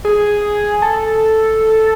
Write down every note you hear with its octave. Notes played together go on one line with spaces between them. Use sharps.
G#4
A4